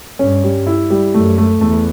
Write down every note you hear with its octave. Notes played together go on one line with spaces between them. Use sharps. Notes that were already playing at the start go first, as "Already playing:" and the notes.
G2 C#4
G3
E4
G3
F#2 A3
A3
E2 A3